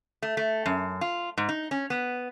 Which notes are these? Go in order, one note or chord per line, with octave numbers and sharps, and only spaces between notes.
A3
A3
F#2
F4
G#2
D#4
C#4
B3